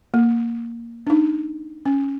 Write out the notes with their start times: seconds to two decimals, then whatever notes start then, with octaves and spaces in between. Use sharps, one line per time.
0.14 A#3
1.07 D4 D#4
1.86 C#4